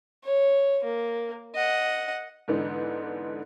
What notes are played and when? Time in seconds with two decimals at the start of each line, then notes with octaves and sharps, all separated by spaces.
0.24 C#5
0.84 A#3
1.55 D#5 F#5
2.48 G#2 D3 E3 B3 D4 D#4